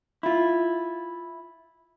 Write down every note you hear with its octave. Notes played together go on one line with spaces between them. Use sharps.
E4 F4